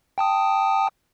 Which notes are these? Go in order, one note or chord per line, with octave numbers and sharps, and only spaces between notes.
G5 A5 D#6